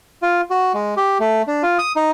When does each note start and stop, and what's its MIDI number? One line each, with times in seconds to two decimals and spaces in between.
0.22 0.41 65
0.50 0.73 66
0.74 0.95 56
0.97 1.18 67
1.20 1.42 57
1.47 1.63 62
1.63 1.78 65
1.78 1.92 87
1.96 2.11 63